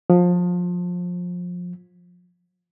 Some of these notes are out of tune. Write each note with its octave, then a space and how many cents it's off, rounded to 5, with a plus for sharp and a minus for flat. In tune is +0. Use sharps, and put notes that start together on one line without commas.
F3 +25